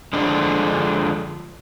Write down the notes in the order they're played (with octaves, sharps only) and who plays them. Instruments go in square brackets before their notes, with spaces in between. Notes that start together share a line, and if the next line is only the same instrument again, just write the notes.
[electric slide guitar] D3 F3 G#3 D4